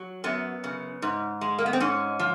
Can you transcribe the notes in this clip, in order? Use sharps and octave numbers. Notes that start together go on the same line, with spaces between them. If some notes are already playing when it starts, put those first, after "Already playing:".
Already playing: F#3
F#2 B3
C#3
G#2
G#3
A#3
B3
C4
G#2 C#4
F3